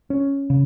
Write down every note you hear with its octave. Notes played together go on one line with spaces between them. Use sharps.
C#4
C#3